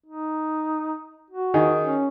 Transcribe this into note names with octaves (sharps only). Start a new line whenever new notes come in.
D#4
F#4
D#3 D#4 G#4
C#4